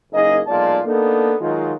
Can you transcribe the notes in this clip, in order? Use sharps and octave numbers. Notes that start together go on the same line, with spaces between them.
F#1 A#3 D#4 G#4 D#5
B1 A#2 G#3 F4 D5 A5
A#3 B3 D4 D#4 A4
D#3 F#3 G#3 D#4 F4